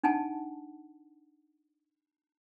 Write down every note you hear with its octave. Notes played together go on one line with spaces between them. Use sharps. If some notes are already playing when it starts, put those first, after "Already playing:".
D4 D#4 F#5 G#5 A5